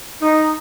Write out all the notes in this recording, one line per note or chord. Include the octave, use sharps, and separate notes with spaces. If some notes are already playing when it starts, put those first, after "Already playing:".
D#4